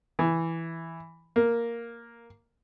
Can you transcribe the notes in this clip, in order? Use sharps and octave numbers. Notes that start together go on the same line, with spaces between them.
E3
A#3